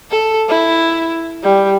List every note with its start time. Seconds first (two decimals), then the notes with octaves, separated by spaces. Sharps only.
0.10 A4
0.49 E4
1.43 G3